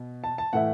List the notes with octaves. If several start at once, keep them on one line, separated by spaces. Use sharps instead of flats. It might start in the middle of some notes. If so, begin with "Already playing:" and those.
Already playing: B2
A5
A5
A2 E3 A3 E4 F#5